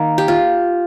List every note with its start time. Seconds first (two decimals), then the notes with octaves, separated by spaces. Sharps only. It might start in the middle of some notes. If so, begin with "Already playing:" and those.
Already playing: D#3 A#3
0.18 G4
0.28 F4